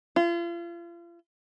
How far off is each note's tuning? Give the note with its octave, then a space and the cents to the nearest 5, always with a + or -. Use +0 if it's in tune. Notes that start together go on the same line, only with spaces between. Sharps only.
F4 -40